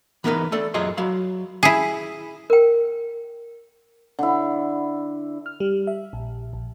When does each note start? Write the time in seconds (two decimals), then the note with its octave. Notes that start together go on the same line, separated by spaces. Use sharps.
0.24 E3 B3 D#4 A#4 B4
0.52 A3 A4 D5
0.74 F#2 F#3 F4 G#4 D#5 C6
0.97 F#3 F5 B5
1.63 E4 G#4
2.50 A#4 G5
4.19 D3 E4
5.46 F6
5.60 G3
5.87 E5
6.13 A#1
6.53 A#1